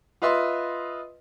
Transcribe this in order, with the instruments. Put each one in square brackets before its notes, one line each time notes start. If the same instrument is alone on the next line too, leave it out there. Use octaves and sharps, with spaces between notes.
[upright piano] F4 B4 D#5 E5 C6